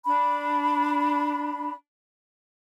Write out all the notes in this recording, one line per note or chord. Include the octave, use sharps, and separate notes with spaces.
D4 B5